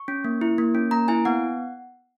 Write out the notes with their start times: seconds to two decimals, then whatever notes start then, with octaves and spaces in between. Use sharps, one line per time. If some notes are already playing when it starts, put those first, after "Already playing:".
Already playing: C#6
0.08 C#4
0.24 A#3
0.41 E4
0.58 A#3
0.75 C#4
0.91 A#3 A#5
1.08 E4 G#5
1.25 B3 F#5